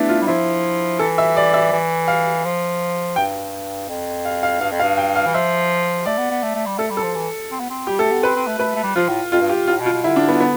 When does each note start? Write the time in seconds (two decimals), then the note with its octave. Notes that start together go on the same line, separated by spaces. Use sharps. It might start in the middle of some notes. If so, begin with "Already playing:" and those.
Already playing: A3 B3 D4 E4
0.09 F4
0.22 G3
0.27 F3 E4
0.99 E3 A4
1.18 E5
1.36 D5
1.54 E5
1.72 E3
2.08 F5
2.45 F3
3.16 G2 G5
3.89 F2
4.25 F5
4.43 F5
4.61 G2 F5
4.72 F2
4.79 F5
4.83 G2
4.97 G5
5.15 F5
5.26 E3
5.34 F3 E5
6.06 A3 D5
6.18 B3
6.31 B3
6.43 A3
6.55 A3
6.66 G3
6.78 A3 A4
6.91 G3
6.97 A4
7.03 F3
7.15 E3
7.52 C4
7.60 B3
7.70 C4
7.87 G3 G4
7.99 A3 A4
8.11 B3
8.23 C4 B4
8.36 C4
8.47 A3
8.59 A3 B4
8.75 A3
8.83 G3
8.96 F3 F4
9.08 A2
9.32 F2 F4
9.41 G2
9.49 G4
9.67 A2 F4
9.81 B2
9.86 F4
9.92 B2
10.04 D3 E4
10.16 D4
10.28 B3
10.40 B3